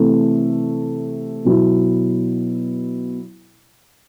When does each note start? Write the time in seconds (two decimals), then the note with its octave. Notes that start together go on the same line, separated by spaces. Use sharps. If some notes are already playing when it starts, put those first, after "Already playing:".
Already playing: C3 E3 A3
1.45 B2 F#3 B3 E4